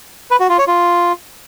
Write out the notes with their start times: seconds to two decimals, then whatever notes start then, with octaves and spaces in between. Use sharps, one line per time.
0.31 B4
0.40 F#4
0.49 F4
0.58 C#5
0.68 F4